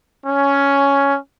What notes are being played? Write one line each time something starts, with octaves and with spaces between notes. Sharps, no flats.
C#4